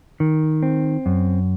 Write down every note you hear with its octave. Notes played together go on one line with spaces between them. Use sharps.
D#3
C4
F#2